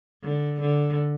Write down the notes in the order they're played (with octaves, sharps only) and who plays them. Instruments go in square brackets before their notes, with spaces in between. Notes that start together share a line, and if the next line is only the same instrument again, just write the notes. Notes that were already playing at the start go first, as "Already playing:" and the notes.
[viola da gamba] D3
D3